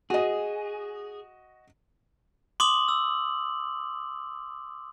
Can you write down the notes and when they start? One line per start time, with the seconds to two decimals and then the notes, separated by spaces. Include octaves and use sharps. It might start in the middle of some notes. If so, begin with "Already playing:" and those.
0.10 F#4 G#4 D#5
2.60 C6 D6 D#6 F#7
2.88 E6